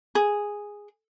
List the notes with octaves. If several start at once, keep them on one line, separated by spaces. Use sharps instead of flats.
G#4